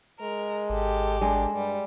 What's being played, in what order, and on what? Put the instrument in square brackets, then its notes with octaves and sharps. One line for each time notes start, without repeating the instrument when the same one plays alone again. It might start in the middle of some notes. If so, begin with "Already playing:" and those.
[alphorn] G#3 [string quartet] A#4
[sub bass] G#1 [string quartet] G4 A4
[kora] G#3 [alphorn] D4
[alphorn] G2 [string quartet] G3